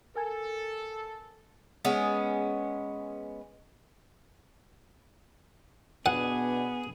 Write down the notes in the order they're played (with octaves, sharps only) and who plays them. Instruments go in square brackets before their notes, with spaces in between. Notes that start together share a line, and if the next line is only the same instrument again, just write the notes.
[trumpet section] A4 [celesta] A#4 G#5 G#6
[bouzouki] G#3 B3 C#4
[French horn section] B2 D4 [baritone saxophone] B3 [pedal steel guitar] G#4 [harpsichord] F#5